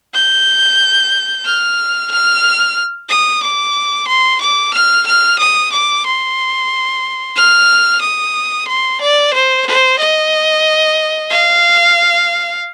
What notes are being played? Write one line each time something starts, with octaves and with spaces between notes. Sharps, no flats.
G6
F6
F6
D#6
D6
C6
D6
F6
F6
D#6
D6
C6
F6
D#6
C6
D5
C5
C5
D#5
F5